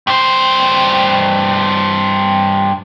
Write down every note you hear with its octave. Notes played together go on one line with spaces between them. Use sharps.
G2 C5